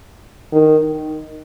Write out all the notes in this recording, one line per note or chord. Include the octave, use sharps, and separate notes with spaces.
D#3